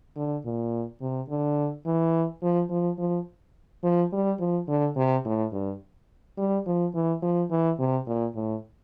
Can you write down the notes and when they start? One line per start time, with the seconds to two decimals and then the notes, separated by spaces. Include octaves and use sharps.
0.17 D3
0.45 A#2
1.01 C3
1.29 D3
1.86 E3
2.43 F3
2.71 F3
2.99 F3
3.84 F3
4.13 G3
4.40 F3
4.69 D3
4.97 C3
5.25 A2
5.53 G2
6.38 G3
6.67 F3
6.95 E3
7.23 F3
7.51 E3
7.79 C3
8.07 A#2
8.36 A2